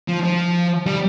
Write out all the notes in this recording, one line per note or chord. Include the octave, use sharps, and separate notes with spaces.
F3
F3
G3